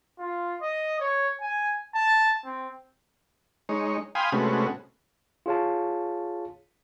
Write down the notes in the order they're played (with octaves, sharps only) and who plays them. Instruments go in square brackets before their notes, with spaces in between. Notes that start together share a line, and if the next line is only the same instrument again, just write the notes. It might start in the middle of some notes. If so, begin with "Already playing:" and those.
[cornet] F4
D#5
C#5
G#5
A5
C4
[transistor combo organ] G#3 D#4 C#5
F5 G5 G#5 B5 C6 D#6
C3 G#3 A3 B3 C#4 F#4
[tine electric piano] F4 G#4 C#5 F5 A5